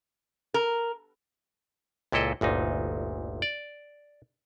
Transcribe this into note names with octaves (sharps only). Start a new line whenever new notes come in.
A#4
C#2 A#2 E4 A4 D#5
G1 D2 A#2 D#4
D5